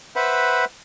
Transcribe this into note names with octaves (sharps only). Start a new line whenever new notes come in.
B4 C5 E5 F#5 B5